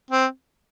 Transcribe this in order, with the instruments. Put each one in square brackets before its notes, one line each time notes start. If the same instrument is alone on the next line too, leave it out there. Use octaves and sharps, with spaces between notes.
[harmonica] C4